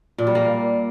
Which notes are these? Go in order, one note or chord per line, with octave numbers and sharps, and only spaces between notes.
A#2
G3
A#3